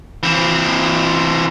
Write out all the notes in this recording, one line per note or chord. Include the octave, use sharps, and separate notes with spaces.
E3 C4